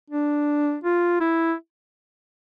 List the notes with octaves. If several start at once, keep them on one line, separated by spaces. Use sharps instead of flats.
D4
F4
E4